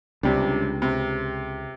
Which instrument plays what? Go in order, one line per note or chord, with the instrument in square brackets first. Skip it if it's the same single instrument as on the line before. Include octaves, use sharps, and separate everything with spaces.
[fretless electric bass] C#2 [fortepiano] C3 G3 D4
[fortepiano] C3